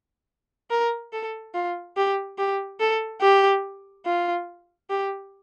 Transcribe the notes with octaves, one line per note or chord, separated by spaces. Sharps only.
A#4
A4
F4
G4
G4
A4
G4
F4
G4